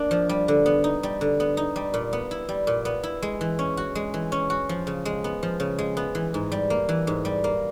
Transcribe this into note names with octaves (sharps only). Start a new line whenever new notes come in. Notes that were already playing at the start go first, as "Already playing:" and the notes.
Already playing: A#3 D4
F3
G3
D3
B3
D#4
G3
D3
B3
D#4
G3
A#2
B3
E4
G3
A#2
B3
E4
G#3
E3
C#4
F#4
G#3
E3
C#4
F#4
F3
C#3
G#3
B3
F3
C#3
G#3
B3
E3
G#2
G3
A#3
E3
G#2
G3
A#3